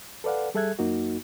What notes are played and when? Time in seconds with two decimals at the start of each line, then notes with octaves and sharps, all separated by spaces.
0.24 A4 B4 D5 F5 F#5
0.55 G3 G#4 A4 E5 F#6 G#6
0.79 F#2 A#3 D#4 F#4